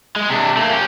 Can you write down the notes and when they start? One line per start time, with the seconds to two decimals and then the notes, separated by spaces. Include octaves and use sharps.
0.16 G#3
0.30 C3 D4
0.57 A3 A#3
0.71 C#4 G4